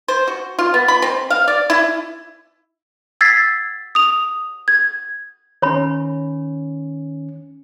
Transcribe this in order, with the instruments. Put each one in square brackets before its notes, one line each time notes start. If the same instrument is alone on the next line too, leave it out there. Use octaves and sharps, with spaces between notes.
[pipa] C5
F#4
F4
B3
B5
C4
F5
D5
E4
[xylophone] E6 G#6 A6 B6 C7
D#6 F7
G#6
[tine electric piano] D#3 C#4 [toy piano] C#5 B5